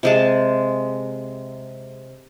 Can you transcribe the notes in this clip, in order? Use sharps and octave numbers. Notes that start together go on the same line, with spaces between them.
C3 G#3 A5